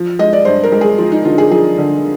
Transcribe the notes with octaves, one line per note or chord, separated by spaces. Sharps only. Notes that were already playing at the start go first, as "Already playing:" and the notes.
Already playing: F3
G#3 D#5
D5
G2 C5
A#4
G#3
G#4
F3 F4
D#4
D3 F4
G#4
F3 G#4
D3